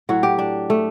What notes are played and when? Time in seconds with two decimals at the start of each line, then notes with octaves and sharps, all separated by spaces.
0.09 A2 F#3 F#4
0.23 G4
0.39 D4
0.70 A3